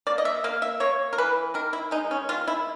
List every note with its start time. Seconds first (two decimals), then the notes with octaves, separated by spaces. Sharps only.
0.07 A#3 D5
0.18 D#5
0.25 E5
0.44 A#3 F5
0.62 E5
0.80 A#3 C#5
1.13 A#4
1.18 E3 B4
1.54 D#3 A#4
1.73 E4
1.91 G#3 D#4
2.11 C#4
2.29 D#3 F4
2.47 E4